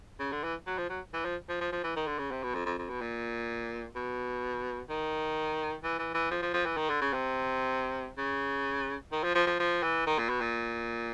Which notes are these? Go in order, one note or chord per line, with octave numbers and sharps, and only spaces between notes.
C#3
D3
E3
F#3
F3
F#3
E3
F3
F3
F3
F3
E3
D#3
D3
C#3
C3
B2
F2
F2
F2
B2
A#2
B2
D#3
E3
E3
E3
F3
F3
F3
E3
D#3
D3
C#3
C3
C#3
D#3
F3
F3
F3
F3
E3
D#3
A#2
B2
A#2